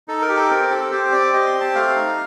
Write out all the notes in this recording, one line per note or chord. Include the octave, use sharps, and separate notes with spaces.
D#4 A4
A#4
G4
A4
C4 A#4
C4 A4
G4 C5
C4 D5
G4 D#5
C6
C4
A5
A3 F5
D#4